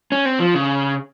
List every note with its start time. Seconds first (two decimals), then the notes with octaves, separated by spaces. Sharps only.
0.12 C#4
0.26 C4
0.40 F3
0.55 C#3